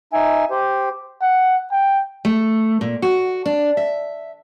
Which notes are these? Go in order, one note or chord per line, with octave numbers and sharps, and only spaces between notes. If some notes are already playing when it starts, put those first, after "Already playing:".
D#4 E5 G#5
G4 C5
F#5
G5
A3
A#2
F#4
D4
E5